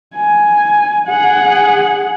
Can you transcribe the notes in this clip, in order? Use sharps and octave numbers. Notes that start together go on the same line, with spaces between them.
G#5
G#4 F#5